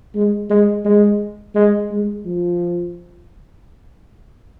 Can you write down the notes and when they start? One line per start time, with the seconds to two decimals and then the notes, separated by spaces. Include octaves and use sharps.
0.15 G#3
0.50 G#3
0.85 G#3
1.55 G#3
1.91 G#3
2.26 F3